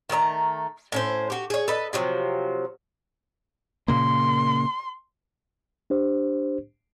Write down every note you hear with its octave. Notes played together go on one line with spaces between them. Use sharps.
D#3 A3 D#5 A#5
A2 C#4 C5
F#4 G4
G#4 C#5
A4 B4 D#5
C3 F3 F#3
A#2 C#3 A#3 C6
D4 G4 C5